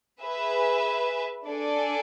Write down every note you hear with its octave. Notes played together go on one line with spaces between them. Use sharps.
G#4 B4 E5
D4 A4 D5 G#5